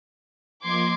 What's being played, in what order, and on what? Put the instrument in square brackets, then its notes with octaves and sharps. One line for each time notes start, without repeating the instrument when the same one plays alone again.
[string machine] F3 A#3 D#5 [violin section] C6 D6 G#6